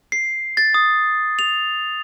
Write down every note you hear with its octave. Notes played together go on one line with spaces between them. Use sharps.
C7
A6
D#6
F7